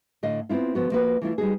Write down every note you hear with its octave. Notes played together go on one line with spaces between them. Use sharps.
A2 D3 D#5 F5
B3 C4 E4 F4
D3 F3 B3 F#4
F3 A#3 F4 F#4 B4
E3 A3 E4 F4
G3 D#4 F#4 G#4